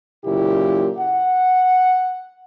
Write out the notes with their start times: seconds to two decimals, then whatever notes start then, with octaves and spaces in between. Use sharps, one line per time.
0.23 F#1 A#2 E4 G4
0.97 F#5